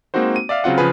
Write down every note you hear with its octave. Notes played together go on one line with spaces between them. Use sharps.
G#3 A#3 C4 D#4 F#4 C5
D#7
D5 E5 F5 F6
C#3 F#3 C4 F4 F#5
C#3 F3 C#4 G#4 B4